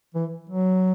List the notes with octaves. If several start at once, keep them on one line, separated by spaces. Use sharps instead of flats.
E3
F#3